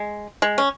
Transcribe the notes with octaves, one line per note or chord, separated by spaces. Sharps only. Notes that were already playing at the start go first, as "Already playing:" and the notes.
Already playing: G#3
G#3
C#4